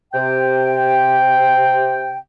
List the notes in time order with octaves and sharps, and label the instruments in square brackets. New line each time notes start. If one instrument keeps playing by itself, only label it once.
[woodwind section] C3 G5